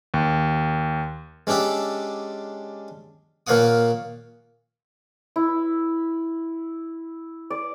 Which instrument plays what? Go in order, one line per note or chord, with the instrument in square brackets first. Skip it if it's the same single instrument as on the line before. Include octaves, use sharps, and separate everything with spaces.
[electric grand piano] D#2
[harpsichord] G#3 C#4 D4 G4 E5
A#2 A#3 C#5 F5 F#5 D#6
[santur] E4
D5